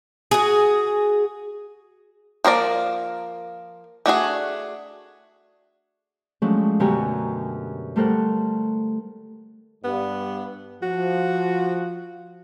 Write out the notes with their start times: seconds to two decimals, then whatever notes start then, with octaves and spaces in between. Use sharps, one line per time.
0.31 F#4 G#4
2.44 F3 A#3 A#4 D5
4.06 A3 D4 F#4 G#4
6.42 F3 F#3 G#3 A3 C#4 D4
6.80 F#2 B2 D3 G4 G#5 A#5
7.96 G3 A3 A4 A#4 C5 F#5
9.84 G2 B3
10.83 F3 F#4